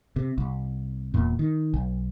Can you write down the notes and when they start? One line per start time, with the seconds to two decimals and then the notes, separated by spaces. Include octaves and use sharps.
0.16 C3
0.38 C2
1.14 E1 E2 A#2
1.39 D#3
1.74 B1